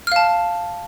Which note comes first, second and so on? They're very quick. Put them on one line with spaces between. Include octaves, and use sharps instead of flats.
F6 F5 A5